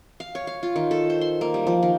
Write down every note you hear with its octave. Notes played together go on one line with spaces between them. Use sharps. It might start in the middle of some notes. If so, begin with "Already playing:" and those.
F5
C#5
F5
F4
D#3
A4
C5
C6
A#3
G3
F3
D#3